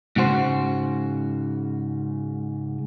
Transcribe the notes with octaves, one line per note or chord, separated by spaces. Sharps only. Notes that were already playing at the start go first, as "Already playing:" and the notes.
G#2 C#3 F#4 C5